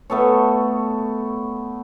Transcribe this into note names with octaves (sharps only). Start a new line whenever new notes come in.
A3 B3 A4 C#5